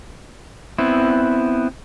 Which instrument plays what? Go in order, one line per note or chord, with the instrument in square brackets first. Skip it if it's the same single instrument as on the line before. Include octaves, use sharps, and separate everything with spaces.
[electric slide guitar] B3 C4 E4